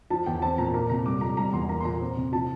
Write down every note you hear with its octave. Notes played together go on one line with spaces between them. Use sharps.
F3 A5
E2 G5
C4 A5
A#2 A#5
A#3 A#5
C3 A#5
G3 D6
F2 A#5
G3 A#5
E2 C6
A#3 A#5
C6
A#2 A#5
C4
C3
F3 A5